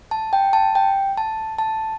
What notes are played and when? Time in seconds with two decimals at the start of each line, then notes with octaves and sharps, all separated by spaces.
0.11 A5
0.33 G5
0.53 A5
0.75 G5
1.17 A5
1.58 A5